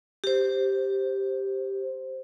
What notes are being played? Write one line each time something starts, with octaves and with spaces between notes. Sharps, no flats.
G4 C5